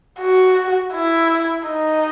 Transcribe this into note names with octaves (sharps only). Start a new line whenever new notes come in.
F#4
E4
D#4